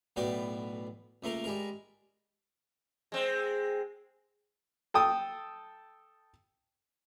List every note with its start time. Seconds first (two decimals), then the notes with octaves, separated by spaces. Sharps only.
0.16 B1 A2 B3 F#4 D5 G5
1.23 C#2 A3 A#3 A#4
1.44 G3 G#3 A#4
3.12 G#3 C4
4.94 A4 G5 D#6